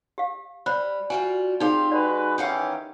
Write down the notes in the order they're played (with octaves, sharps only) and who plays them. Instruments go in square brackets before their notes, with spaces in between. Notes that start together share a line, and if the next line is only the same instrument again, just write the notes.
[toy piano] G4 F5
[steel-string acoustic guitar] G3 [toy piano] C5 B5
[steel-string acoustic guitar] G3 F4 F#4 [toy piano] G#5
[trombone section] C4 F4 [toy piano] D#4 G#4 [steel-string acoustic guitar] G4 F5
[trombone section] G#3 F#4 B4 [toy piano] D5
[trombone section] D#3 E3 C#4 [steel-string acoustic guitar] G4 F5 F#5